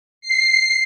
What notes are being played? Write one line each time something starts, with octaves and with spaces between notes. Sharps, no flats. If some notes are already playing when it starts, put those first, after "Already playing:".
C7